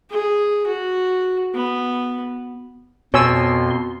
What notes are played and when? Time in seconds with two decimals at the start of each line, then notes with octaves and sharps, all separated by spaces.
0.11 G#4
0.67 F#4
1.55 B3
3.14 F2 B2 C#5 G#5 C6 E6